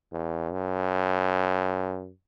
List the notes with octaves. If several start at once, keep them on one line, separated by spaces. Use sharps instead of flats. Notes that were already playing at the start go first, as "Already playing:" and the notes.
E2
F#2